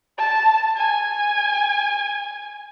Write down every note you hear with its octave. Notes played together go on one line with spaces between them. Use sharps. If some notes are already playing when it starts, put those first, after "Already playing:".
A5
G#5